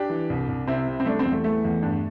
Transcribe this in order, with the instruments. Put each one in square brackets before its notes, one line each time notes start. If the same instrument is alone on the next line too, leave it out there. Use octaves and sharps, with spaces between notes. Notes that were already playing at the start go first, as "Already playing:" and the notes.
Already playing: [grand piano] D4 G4
E3
C2
C2
C3 C4 E4
C3
C4
G3 A3 D4
C4
E2
A3
E3 A3
E2
G2